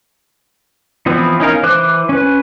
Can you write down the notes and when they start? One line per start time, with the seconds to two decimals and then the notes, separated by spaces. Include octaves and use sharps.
1.06 E3 F3 B3 C4
1.40 C#4 D#4 A#4 F5
1.63 E3 C5 D6 F#6
2.09 C#4 B4